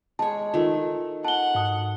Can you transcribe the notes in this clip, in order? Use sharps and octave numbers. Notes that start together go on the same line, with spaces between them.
G#3 C#5 A5
D#3 A3 F4
F#5 A5 G7
G#2 D#6